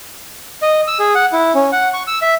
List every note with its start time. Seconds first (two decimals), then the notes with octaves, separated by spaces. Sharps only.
0.62 D#5
0.88 E6
0.99 G#4
1.15 F#5
1.32 E4
1.55 C#4
1.72 F#5
1.93 C#6
2.07 E6
2.22 E5